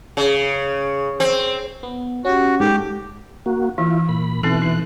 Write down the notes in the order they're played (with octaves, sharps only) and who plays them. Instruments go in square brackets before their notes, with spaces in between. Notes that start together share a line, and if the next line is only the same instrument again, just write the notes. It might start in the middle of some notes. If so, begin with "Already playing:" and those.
[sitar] C#3
C4
[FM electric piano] B3
[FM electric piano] C#4 G4 [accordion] F#4
[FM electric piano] G#2 A4 [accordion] G4
[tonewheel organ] A#3 F#4
[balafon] E3 [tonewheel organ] E4 F4
[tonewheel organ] A#2 B5
[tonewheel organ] B2 E3 F#6 [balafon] C4 D#4 A4
[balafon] D#4